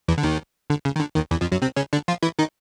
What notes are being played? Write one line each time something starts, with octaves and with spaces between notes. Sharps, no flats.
E2 E3
D3
D#2 D#3
D3
C#3
D#3
D3
D#2 D#3
E2 E3
F2 F3
F#2 F#3
C3 C4
C#3 C#4
D3 D4
F3 F4
E3 E4
D#3 D#4